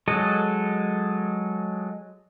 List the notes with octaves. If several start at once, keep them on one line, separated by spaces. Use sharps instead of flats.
F#3 G#3 A4 D#5